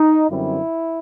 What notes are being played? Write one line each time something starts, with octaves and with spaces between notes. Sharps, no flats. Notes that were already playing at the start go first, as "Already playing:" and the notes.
Already playing: D#4
F#2 D3 G3 C4 E4